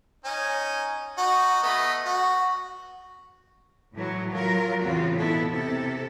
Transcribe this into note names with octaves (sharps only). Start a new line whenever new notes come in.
C#4 D#4
D#4 F#4
A3 B3 D#5
F#4
A2 E3 F#3
F#3 F4 A#4
E2 A2 C#3 C4 F4 F#4
B2 B3 E4 A4
C3 A4